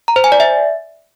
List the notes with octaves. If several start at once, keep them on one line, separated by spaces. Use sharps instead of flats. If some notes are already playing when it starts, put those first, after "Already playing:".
A#5
C5
G#5
D5
E5